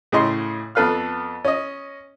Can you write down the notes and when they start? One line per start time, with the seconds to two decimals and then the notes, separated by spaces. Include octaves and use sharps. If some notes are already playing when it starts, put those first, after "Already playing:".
0.12 A2 C#3 G#4 D#5 C6
0.75 F2 B3 A4 B4 F5 F6
1.45 C#4 D#5